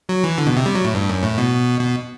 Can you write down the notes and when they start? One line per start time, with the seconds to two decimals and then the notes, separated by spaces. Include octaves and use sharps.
0.09 F#3
0.24 E3
0.38 D3
0.46 B2
0.57 C3
0.66 G3
0.75 F#3
0.85 A2
0.94 G2
1.09 F#2
1.23 A2
1.38 B2
1.81 B2